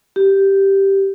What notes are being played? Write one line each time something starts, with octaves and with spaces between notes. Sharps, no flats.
G4